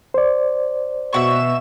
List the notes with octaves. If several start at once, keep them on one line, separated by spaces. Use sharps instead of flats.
C5 D5
B2 E5 F#5 C#6 E7